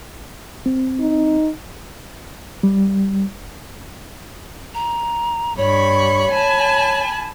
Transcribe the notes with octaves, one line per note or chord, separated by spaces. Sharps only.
C4
D#4
G3
A#5
G2 C#5 B5 C#6
G#5 A5 B5